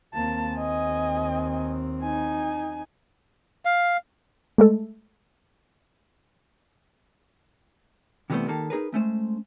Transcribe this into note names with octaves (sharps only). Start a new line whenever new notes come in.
D#2 A#3 C4 A5
D#5 G#5
D#4 G#5
F5
G#3 A3 A4
C3 E3 G3 A3 B3 C5
D#3 A#3 G4 A4
D#4 G#4 A#4 B4
G#3 A3 C#4 C5